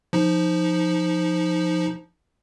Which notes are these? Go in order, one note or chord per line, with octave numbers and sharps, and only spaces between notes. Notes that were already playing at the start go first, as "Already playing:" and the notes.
F3 D#4